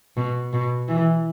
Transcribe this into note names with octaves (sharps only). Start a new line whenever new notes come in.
B2
B2
E3